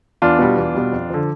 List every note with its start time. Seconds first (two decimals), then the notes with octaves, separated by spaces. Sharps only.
0.22 E2 D4 F4
0.39 B2 G3
0.57 E2
0.74 B2 G3
0.92 F2
1.10 D3 F3